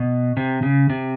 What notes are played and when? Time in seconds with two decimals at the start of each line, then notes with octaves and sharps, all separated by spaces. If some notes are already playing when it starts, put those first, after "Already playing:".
Already playing: B2
0.37 C3
0.63 C#3
0.90 C3